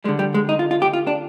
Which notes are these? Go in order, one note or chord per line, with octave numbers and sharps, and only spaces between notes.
D3 G3 G#3
G3
G#3
D#4
F4
F4
G4
F4
D4